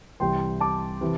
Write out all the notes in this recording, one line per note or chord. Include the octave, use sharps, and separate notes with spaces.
C2 C3 E3 G5 C6
A5 D6
C3 E3